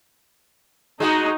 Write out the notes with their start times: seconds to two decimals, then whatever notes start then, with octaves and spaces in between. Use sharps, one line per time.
1.00 G#3 D#4 F#4